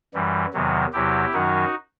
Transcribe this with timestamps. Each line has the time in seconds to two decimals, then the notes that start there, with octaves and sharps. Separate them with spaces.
0.14 F#2 E3 G3
0.53 E2 C3 D#3 F#3
0.93 E2 C3 F#3 E4 G4
1.33 F#2 D#3 F#3 D#4 F#4